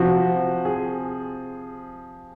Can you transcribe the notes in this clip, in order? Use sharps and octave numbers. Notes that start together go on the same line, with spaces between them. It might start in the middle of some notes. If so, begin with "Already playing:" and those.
Already playing: C3 F3 C4 F#4
G#4